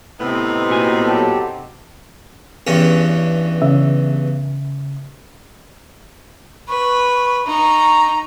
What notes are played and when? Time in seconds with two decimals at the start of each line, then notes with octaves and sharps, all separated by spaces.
0.20 A2 C3 B3 C4 D#4
0.70 A#2 F#4 G#5
1.05 F#3 G4 A4
2.67 E2 G2 C#4
3.62 C#3 E5
6.68 B4 C#6
7.46 D#4 A#5 C#6